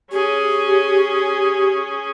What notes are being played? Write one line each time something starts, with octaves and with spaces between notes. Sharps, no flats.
C#4 G4 G#4